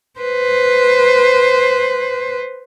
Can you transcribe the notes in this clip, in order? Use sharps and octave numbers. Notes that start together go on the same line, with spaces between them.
B4 C5